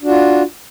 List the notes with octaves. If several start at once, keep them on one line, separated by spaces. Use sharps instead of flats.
D4 F4 F#4